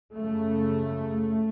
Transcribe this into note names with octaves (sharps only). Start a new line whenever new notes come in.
F#2 C#3 A3